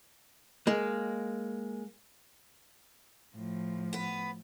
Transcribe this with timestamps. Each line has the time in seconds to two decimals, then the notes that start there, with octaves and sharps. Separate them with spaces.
0.67 G#3 A#3
3.35 A2 F3
3.93 B3 B4